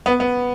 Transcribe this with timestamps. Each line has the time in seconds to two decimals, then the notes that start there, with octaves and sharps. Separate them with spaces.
0.06 B3
0.20 B3